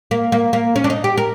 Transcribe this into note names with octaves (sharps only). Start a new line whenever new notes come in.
A#3
A#3
A#3
C#4
D4
D#4
G4
A#4